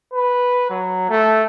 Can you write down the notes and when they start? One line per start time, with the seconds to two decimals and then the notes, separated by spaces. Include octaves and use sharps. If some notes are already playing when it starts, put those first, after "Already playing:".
0.14 B4
0.70 F#3
1.10 A3